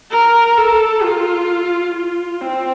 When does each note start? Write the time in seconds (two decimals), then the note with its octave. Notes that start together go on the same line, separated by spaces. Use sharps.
0.11 A#4
0.57 A4
1.03 F4
1.94 F4
2.41 C4